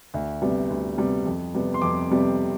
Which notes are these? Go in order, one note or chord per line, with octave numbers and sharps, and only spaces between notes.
D2
C3 G3 B3
D2
C3 G3 B3
F2
C3 G3 B3
C6
F2 D6
C3 G3 B3